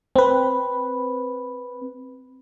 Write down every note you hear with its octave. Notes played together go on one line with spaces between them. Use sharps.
C4 B4